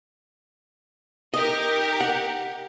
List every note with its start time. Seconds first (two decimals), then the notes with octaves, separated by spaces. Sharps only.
1.34 D#4 G4 A#4 D#5
2.01 F#5